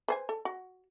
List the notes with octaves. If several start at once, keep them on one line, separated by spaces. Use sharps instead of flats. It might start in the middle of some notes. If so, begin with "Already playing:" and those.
B4 C5 G#5
A4
F#4